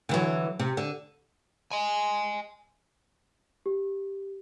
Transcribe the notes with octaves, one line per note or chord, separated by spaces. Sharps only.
D3 E3 F#3
C3
D3
D#5 G#5
G4